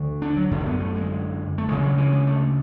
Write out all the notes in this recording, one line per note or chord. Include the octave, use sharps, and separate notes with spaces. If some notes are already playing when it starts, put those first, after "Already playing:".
Already playing: D2 D3
D4
F#3
F#2 D3
A3
B3
A3
G#3
A3
D2 C#3 G#3
F#3
E3
G#3
A3